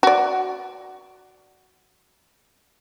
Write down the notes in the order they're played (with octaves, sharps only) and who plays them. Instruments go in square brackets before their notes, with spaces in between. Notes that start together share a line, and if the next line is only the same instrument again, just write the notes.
[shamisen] F#4 D5